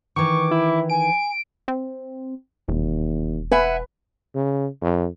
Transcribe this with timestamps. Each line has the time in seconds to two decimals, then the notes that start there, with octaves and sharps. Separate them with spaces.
0.16 D#3 E3 C#6 D6
0.51 E4
0.90 G#5 D7
1.68 C4
2.68 E1 D#2
3.52 B4 E5 F#5 G#5
4.35 C#3
4.82 F2